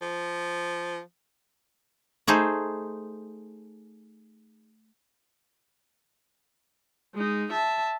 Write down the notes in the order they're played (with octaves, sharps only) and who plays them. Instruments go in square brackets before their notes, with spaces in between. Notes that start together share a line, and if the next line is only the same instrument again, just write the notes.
[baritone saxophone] F3
[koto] A3 D#4 G#4 C5
[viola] G#3 D#4
E5 A5